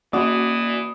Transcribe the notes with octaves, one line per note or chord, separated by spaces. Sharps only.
E3 A#3 C#4 F#4 D5 B5 D#6